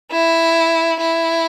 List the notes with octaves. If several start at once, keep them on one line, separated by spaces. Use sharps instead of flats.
E4
E4